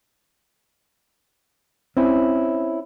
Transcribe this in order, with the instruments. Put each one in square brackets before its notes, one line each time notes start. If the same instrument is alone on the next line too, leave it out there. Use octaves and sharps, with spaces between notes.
[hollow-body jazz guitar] C4 C#4 E4